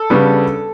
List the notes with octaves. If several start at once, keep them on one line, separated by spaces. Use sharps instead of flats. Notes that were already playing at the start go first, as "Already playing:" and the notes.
Already playing: A4
C#3 G3 B3 D4